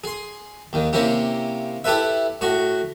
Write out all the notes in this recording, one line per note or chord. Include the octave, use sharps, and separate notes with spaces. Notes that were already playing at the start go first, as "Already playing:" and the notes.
G#4 C6
D#2 D#3
C3 A#3 C#4 E4 G4
E4 G4 A4 B4 E5
A2 F#4 C#6